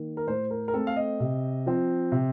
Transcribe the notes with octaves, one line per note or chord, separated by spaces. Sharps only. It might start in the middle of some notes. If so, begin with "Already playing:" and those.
Already playing: D#3 A#3
A#4
A2 C5
A#4
A#4
A3 C4 A4
F5
D#5
C3
F3 C4
C3